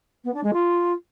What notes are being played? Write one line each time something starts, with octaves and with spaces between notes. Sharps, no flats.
B3
D4
G#3
F4